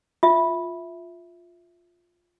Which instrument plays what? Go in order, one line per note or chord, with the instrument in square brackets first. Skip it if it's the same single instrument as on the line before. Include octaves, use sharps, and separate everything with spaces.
[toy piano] F4 E5